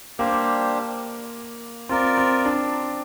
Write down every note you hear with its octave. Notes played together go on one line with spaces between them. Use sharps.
G3 A#3 D4 G4 C5
C4 F4 A#4 D5
C4
D4